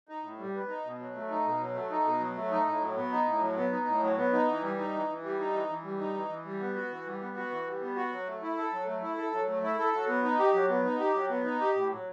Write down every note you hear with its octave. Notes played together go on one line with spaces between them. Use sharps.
D#4
A2
G3
B3
D#4
B2
F#3
A3
D#4
B2
F#3
A3
D#4
B2
F#3
A3
D#4
A2
F#3
B3
D#4
A2
F#3
B3
D#4
A2
F#3
B3
D#4
E3
G3
D#4
E3
E3
G3
D#4
E3
E3
G3
D#4
E3
E3
G3
B3
F#4
E3
G3
B3
F#4
E3
G3
B3
F#4
F#3
A3
E4
A4
F#3
A3
E4
A4
F#3
A3
E4
A4
F#3
B3
D#4
G4
F#3
B3
D#4
G4
F#3
B3
D#4
G4
A2
F#3